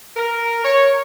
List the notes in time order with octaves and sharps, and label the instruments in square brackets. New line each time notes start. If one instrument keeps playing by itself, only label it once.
[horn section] A#4
C#5